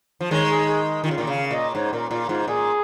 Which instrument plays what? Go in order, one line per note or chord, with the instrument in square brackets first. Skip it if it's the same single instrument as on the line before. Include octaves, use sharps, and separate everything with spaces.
[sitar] F3
[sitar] D#3 G#3 [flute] C#5
[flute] G#4
G#4
[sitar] D#3 [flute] F4
[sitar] C#3
A#2 D#3
[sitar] C#3 [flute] F5
[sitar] A#2 [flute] D#5
[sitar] G#2 [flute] C#5
[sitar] A#2 [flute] A#4
[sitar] A#2 [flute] F4
[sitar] G#2 [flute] F4
[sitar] A#2 [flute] G#4